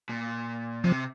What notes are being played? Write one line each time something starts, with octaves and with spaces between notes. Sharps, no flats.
A#2
C3 F3